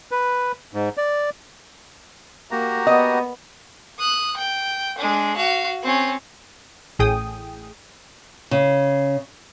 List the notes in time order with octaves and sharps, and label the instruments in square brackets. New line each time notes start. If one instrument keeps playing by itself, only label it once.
[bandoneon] B4
G#2
D5
[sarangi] A#3 [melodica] F#4 G4 A#5
[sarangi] B3 [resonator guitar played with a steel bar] D#5
[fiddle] D#6 F#6
G5
G#3 D4
F#4 F5
C4 C#4
[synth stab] A1 A2 G#4 G5 D#6
[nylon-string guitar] C#3